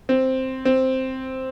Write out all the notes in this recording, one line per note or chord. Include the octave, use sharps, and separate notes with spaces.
C4
C4